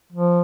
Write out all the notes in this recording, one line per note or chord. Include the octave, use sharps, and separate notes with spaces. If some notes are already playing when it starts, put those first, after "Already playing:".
F3